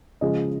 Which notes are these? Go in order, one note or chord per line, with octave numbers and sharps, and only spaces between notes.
C#3 F3 G#3 D#5